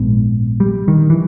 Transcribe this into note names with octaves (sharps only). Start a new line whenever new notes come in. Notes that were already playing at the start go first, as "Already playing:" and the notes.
Already playing: A#1 G#2 B3
G3
D#3
E3